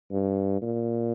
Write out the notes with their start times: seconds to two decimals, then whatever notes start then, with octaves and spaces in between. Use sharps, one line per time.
0.11 G2
0.62 A#2